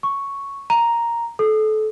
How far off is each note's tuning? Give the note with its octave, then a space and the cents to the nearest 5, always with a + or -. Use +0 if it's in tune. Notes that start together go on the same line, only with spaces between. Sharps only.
C#6 +0
A#5 +0
A4 -30